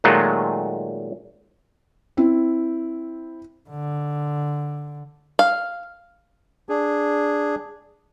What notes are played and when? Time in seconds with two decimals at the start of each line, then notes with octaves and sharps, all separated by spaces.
0.04 A#2 D#3 F#3 G#3 A3 F4
2.17 C4 E4
3.69 D3
5.39 F5
6.69 D4 G#4